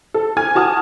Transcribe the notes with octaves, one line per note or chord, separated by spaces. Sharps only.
A4
G#5 F6 G#6
F#4 A5 D#6 F6